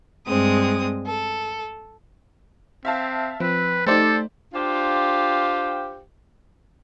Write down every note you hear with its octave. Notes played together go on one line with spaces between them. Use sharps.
G2 G#3 C4 D#6
A4
C4 E5 F5 A5
F3 C4 B4
A3 D#4 G4 A4 C5 D5
D4 F4 G4 C5 F5 G5